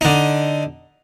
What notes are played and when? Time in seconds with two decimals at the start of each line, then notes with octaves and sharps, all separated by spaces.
0.01 D3 D#4